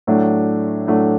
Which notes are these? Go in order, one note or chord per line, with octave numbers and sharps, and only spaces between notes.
A2 F#3 A3 D4
A2 F#3 A3 D4